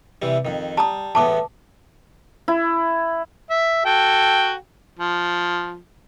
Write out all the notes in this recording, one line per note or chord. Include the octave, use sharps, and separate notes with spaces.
C3 E3 G3
F2 D#3
G3 A5 A#5 D#6
E2 A2 B3 A5 D6 D#6
E4
E5
F#4 A4 G5
F3